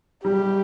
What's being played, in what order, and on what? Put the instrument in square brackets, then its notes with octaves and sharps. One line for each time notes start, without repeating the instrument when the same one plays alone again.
[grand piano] G3 [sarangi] G4